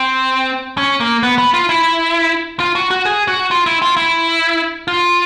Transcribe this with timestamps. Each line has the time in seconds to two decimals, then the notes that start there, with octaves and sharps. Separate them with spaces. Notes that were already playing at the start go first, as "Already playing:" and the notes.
Already playing: C4
0.78 C#4
1.00 A#3
1.23 B3
1.38 B3
1.54 F4
1.69 E4
2.60 F4
2.75 F#4
2.91 F#4
3.06 G#4
3.28 F#4
3.51 F4
3.66 E4
3.82 F4
3.97 E4
4.88 F4